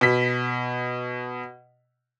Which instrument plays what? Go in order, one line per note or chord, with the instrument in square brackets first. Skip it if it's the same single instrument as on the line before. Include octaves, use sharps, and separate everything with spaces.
[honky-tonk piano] B2 B6